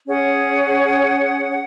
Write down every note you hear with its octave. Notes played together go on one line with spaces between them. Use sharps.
C#4 G#4 C#5 F#5
F#5